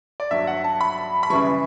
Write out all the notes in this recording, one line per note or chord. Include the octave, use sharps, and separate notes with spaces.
D5
G2 F#3 E5
F#5
A5
B5
B5
F#2 C#3 E3 G3 C#6